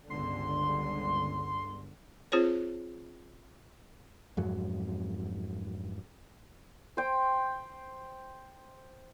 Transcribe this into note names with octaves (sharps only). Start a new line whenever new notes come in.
G1 C#2 D3 C6
C4 F4 G#4 C5 C#5
F2 G#2 F#3
C5 G5